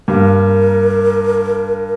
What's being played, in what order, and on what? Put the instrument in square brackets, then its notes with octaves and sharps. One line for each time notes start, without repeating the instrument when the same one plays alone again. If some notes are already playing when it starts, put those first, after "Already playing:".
[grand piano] G2 G3 A#3 [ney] A#4